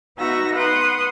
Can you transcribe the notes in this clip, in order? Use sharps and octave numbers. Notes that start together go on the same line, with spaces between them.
B3 D#4 F#4 E5 E6 A#6
B4 F#5 C6 D#6